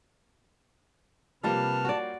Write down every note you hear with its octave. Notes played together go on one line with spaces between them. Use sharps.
C3 F3 G3 A#3 B4 A5 F6
F#4 D5